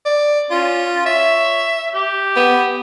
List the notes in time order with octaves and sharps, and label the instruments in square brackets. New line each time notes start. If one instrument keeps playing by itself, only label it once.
[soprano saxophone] D5
[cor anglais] C#4 [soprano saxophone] F4
[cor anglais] C#5 [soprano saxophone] E5
[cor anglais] G4
[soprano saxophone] B3